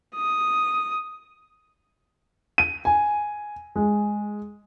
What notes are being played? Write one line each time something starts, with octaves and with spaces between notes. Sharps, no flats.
D#6
D#7
G#5
G#3